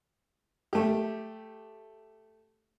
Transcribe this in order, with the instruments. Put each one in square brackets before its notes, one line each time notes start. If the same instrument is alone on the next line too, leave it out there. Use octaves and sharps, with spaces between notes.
[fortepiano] A3 G4